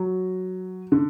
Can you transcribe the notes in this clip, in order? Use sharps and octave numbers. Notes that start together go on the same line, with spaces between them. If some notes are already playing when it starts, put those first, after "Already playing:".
Already playing: F#3
D3